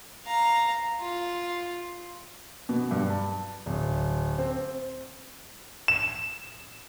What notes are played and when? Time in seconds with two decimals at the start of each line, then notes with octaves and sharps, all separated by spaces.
0.25 F5 A#5
1.00 F4
2.69 B2
2.91 G2
3.10 A5
3.66 D1
4.38 C4
5.88 E7